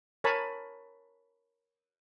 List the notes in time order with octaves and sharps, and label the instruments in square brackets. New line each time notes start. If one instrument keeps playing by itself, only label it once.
[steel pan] A#4 C#5 G#5 A5 B5